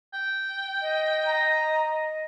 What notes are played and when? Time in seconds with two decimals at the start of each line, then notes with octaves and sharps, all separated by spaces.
0.14 G5
0.82 D#5
1.26 A#5